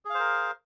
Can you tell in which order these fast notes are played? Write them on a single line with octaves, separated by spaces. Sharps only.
G#4 F5 C5 A#4